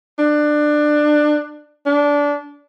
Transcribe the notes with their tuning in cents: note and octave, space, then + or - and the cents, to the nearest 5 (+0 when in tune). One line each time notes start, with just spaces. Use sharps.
D4 +20
D4 -20